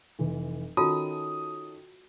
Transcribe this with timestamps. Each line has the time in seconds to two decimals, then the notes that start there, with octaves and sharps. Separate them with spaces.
0.19 F1 E3
0.77 D#3 C#4 F4 F#4 A4 A5 D#6